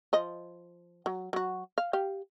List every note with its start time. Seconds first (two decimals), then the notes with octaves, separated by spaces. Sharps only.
0.13 F3 D#5
1.06 F#3
1.33 F#3 F#4
1.78 F5
1.93 G4 F5